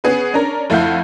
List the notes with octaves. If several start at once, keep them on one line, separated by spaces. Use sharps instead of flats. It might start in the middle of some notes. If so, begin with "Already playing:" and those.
B3 C#4 G#4 B4
C#4 D4 A#4 A#5
F2 A3 E4 F5 F#5 G6